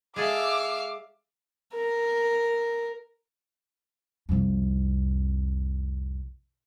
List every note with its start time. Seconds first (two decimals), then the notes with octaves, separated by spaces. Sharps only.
0.16 G#3 G#4 A4 E5 F5 D6
1.73 A#4
4.29 C2 F2